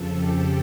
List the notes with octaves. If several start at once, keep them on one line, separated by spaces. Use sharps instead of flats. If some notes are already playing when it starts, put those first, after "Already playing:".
Already playing: F2 C#3 F3 A4
G4